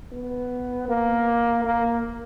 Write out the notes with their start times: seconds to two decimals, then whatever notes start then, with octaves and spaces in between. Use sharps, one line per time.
0.13 B3
0.89 A#3
1.65 A#3